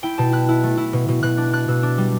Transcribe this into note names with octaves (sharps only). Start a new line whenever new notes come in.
E4 G5
B2 A5
E4 F#6
E4
A3
E4
B2
B2
B2 F#6
D4
D4 F#6
B2 E6
D4
G3